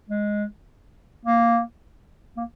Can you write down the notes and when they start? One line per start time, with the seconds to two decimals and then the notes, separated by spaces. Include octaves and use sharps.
0.09 G#3
1.25 A#3
2.37 A#3